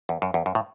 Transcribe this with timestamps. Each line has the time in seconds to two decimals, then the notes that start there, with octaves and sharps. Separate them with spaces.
0.09 E2
0.22 F#2
0.34 E2
0.46 F#2
0.55 A2